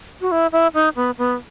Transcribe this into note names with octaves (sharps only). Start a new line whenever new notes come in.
F#4
E4
E4
D#4
B3
B3